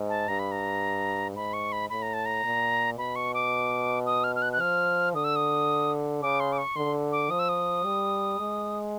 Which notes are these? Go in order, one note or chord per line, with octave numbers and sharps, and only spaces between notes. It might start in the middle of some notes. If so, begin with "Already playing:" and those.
Already playing: G#2
A5
G2 A#5
B5
A#5
G#2 B5
C#6
B5
A2 B5
A#5
A5
A#5
A#2
B2 B5
C#6
D6
D#6
F6
F6
F#6
F#6
F3 F6
D3 D#6
E6
D#6
C#3 D6
C6
D6
C#6
D3 C6
D6
F3 D#6
E6
D#6
G3
G#3